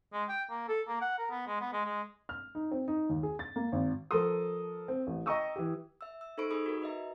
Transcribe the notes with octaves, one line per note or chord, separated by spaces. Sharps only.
G#3
G5
A#3
A4
A#3
F#5
A#4
B3
G#3
B3
G#3
G#3
F6
D#4
C4
D#4
D#2
G#4
A6
A#3
G#1
F3 A4 A#4 C6 D#6
C4
A1
D#5 G5 A#5 C#6 D#6 E6
E3 G4
E5 E6
E6
D#4 A4 C5 B5 C#6 D7
D#4 G#4 B5 D#6
F#4 A#4
B4 D#5 E5 A#5